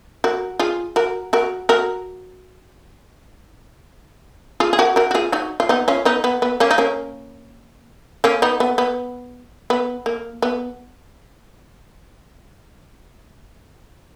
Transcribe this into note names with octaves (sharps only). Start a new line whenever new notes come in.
F#4 A#4
F4 G#4
F#4 A#4
F#4 A#4
F#4 A#4
F4 G#4
G#4
F#4 A#4
F#4 A#4
F#4
F4 G#4
D#4 F#4
F4
B3 D#4
C#4 F4
B3 D#4
B3
B3
A#3 C#4
D#4
A#3 C#4
A#3 C#4
B3 D#4
B3
B3
B3
A#3
B3